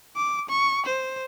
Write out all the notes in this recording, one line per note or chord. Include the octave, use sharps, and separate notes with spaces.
D6
C#6
C5